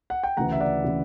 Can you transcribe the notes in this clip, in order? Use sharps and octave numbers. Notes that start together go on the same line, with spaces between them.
F#5
G5
D2 C#3 E3 F#5 A#5
E5
D5 F#5
C#3 E3